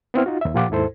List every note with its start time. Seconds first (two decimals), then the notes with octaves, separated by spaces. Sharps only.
0.14 B3 C4 E4 F6
0.26 D#4 F4 F#4
0.41 D#2 E5
0.54 A#2 F3 F4 G4 F#5 D6
0.70 D#2 G#2 E4 A4 C5